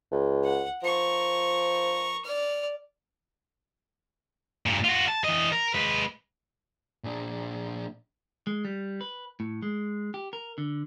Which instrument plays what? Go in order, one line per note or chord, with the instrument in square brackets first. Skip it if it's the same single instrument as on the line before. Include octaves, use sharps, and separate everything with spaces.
[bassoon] C#2
[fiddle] F#5
[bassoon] F3 [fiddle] A#4 C#6
[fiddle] D5 F6
[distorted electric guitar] G2 A#2
F4 F#4
A5
E3 D#5
A#4
G#3 B4
[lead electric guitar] A#2 D4
[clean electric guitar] G#3
G3
B4
A2
G#3
G4
A#4
D3